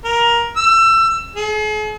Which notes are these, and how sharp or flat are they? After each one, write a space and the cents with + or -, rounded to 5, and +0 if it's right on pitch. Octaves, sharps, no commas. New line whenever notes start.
A#4 +15
E6 +25
G#4 +45